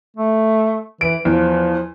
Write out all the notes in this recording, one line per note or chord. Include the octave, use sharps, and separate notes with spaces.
A3
E3 D7
E2 F3